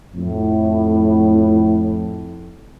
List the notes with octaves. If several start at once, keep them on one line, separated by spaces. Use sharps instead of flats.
F2 A2